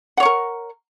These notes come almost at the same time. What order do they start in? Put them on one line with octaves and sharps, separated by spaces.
F#5 C#5 C#6 A#4